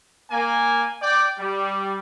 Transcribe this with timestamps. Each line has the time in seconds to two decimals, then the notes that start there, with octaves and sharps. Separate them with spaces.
0.31 A#3 G#5
1.02 D5 G5
1.39 G3